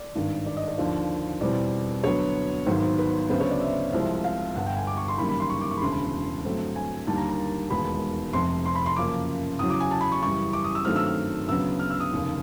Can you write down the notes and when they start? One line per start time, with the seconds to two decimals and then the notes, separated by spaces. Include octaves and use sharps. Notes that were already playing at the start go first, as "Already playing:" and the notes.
Already playing: D5
0.15 G#1 G2 D#3
0.47 D5
0.57 D#5
0.68 D5
0.78 D#2 D3 F3
1.41 E2 B2 G3 C4 D5
2.04 D2 D3 F#3 B3 C#5
2.66 G#1 G#2 D#3 F#3 B3 C5
2.98 B4
3.30 D2 C#3 F#3 B3 C5
3.40 C#5
3.51 D5
3.61 E5
3.93 C2 C3 F3 G#3 C4
4.24 F5
4.55 G1 G2 D3 F#5
4.66 G5
4.77 G#5
4.87 D6
4.97 C#6
5.08 C6
5.18 F#1 F#2 D#3 G3 A#3 B5
5.29 B5
5.40 C6
5.50 C#6
5.61 D6
5.71 C#6
5.77 B5
5.82 E1 D2 C#3 C6
5.92 B5
6.45 G2 D3 F#3 A3 C4
6.76 G#5
7.07 D#2 D3 G3 A#3 A5
7.18 A#5
7.29 A#5
7.70 E1 D#2 D#3 G#3 B3 B5
8.33 F1 F2 C3 C6
8.66 C6
8.75 B5
8.86 C6
8.96 F#2 C#3 F3 A#3 D6
9.59 E2 C#3 F#3 D#6
9.70 D6
9.80 G#5
9.91 A5
10.01 B5
10.12 C#6
10.22 F#2 C#3 E3 G3 C#6
10.53 D6
10.64 D#6
10.75 E6
10.85 G2 D#3 F#3 A3 C4 F6
10.96 E6
11.06 F6
11.48 D2 C#3 F#3 B3 E6
11.79 F6
11.90 E6
12.00 D#6
12.11 F1 D#2 C#3